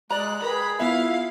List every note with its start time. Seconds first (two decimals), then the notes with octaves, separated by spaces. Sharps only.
0.10 G#3 D5 A#5 F#6
0.42 G#4 A#4 B4 G5 B5
0.80 B3 E4 F4 E5 F5 C7